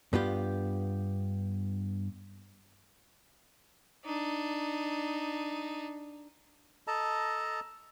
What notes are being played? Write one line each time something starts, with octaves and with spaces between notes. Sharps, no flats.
G2 B3 F4 G4
D4 D#4
A4 D#5 A5 A#5